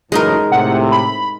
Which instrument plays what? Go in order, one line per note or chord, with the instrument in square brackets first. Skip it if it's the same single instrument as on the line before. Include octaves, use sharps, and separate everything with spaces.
[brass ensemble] F#1 A2 E3 [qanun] G#3 D#4 A#4
[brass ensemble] A2 C3 [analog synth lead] F#5
[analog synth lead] B5